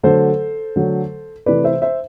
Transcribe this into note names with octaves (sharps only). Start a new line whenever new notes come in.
D3 F#3 A3 A4 C5
D3 F#3 A3
C3 E3 A3 B4 D5
C5 E5
C5 E5